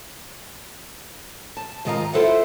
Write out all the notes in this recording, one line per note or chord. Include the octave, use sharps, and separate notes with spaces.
A5
G#2 D#3 F4 D#5 F5 A#5
E4 F4 A4 C5 E5 F#5